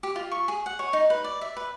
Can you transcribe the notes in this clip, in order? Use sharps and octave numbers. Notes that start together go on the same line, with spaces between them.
G4
F4
C#6
G#4
F#5
C#5
D#4
B4
D5
E5
B4